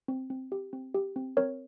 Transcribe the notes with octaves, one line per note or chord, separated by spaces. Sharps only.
C4
C4
G4
C4
G4
C4
C4 A#4 C#5